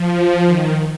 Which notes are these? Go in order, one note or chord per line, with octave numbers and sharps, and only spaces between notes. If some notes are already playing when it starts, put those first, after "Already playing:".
Already playing: F3
D#3